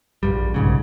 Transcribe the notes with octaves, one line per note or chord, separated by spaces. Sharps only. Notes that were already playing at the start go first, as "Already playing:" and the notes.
A#1 G2 G3
B1 G#2 C#3